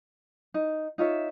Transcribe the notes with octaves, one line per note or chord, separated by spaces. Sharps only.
D#4
D#4 F4 C#5 E5